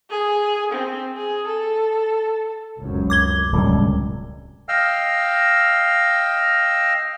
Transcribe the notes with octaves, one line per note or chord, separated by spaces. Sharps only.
G#4
C4
G#4
A4
F1 C#2 F#2
D6 G#6 G7
D1 C#2 F#2 C3 G3
D#5 F5 G5 E6 F6